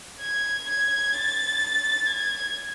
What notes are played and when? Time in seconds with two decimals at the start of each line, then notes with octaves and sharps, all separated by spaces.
0.21 G#6
0.67 G#6
1.13 A6
2.06 G#6